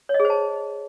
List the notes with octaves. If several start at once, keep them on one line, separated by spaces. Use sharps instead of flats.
C#5
D#5
G#4
C5
A5